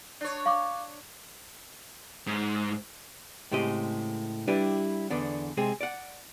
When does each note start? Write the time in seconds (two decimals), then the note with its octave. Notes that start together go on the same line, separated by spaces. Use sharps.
0.21 D4 C#5
0.46 F5 C#6 D6
2.27 G#2
3.51 A2 C#3 G#3 C4 G4 D#5
4.48 G3 D4 E4 G4 B4
5.10 E2 D3 B3 D4
5.57 C3 G#3 C4 G#4
5.81 D5 F#5